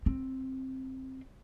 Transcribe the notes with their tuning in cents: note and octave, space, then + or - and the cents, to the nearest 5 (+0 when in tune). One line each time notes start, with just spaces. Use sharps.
C4 +10